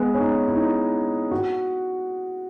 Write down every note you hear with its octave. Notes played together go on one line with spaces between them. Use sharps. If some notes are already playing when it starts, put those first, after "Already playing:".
Already playing: G#3 B3
C#4
D#4
E4
D#4
E4
F#4